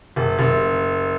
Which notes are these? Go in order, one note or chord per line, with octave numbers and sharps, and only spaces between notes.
F#1
F#1